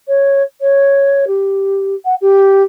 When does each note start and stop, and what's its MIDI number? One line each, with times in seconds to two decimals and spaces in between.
0.08 0.42 73
0.61 1.25 73
1.27 1.95 67
2.05 2.15 78
2.21 2.63 67